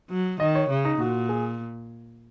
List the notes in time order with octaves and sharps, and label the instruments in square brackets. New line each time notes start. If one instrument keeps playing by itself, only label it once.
[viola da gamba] F#3
[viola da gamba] D#3 [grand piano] D#5
[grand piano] C#5
[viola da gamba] C#3
[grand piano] D#4
[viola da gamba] A#2 [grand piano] F#4
[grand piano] G#4